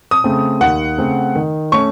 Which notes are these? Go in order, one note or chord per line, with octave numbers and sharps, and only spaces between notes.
D#6
C#3 A3 C4
D#2 F#5
C#3 A3 C4
D#3
A3 C#4 C#6